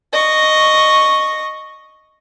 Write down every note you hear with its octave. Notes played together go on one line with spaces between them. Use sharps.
D#5 C#6